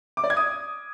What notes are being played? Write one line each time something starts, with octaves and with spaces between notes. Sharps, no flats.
D6
D5
G#6
D#6